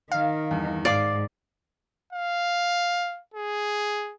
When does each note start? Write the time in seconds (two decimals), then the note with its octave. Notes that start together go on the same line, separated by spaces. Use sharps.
0.12 D#3 F5
0.51 E2 G2
0.85 G#2 D5 F5 D6 C7
2.13 F5
3.34 G#4